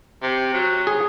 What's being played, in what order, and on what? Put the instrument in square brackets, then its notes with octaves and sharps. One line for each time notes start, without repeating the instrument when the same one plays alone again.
[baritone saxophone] C3
F#3
[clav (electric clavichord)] G#4